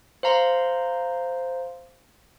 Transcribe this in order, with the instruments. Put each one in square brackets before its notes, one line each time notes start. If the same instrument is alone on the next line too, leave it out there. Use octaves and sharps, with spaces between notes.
[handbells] C5 F5 A#5 C6